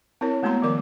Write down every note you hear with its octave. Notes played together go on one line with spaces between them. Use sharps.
C4 E4 A#4 C#5
G#3 A3 B3 F#4 A#5 C6
D#3 F3 G3 A#4 D5 D6